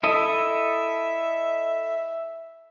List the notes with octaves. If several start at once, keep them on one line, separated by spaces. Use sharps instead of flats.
E4 A4 D#5 E5